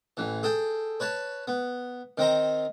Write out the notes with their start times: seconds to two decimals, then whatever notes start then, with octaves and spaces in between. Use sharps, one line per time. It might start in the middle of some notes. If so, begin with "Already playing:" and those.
0.17 A1 E3
0.43 G#4 A4 G5
1.00 B4 C#5 A5
1.48 B3
2.18 D#3 C4 C5 A#5